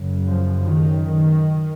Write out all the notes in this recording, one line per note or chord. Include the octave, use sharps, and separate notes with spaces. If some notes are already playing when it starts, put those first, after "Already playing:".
Already playing: F#2 C#3
F3
D#3
D#3